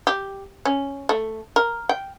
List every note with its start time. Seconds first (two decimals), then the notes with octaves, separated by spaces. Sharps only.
0.07 G4
0.65 C#4
1.09 A3
1.56 A#4
1.89 G5